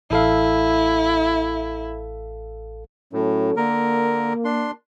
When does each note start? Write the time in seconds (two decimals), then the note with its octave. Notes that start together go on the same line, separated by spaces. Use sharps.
0.11 A1 E4 A4 F5
3.13 A2 F#3 C#4 A4
3.57 D3 A#3 A#4
4.45 D4 C6